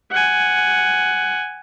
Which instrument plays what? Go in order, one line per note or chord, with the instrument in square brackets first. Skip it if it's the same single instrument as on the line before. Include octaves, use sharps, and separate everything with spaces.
[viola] F#5 G#5